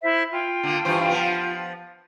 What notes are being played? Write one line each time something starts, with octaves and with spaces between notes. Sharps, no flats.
E4 C5 E5
F4 G5
D3 A#3
G2 E3 C5
F3 B3